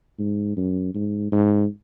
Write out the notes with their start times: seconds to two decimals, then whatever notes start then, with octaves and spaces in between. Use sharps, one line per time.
0.19 G#2
0.57 F#2
0.94 G#2
1.32 G#2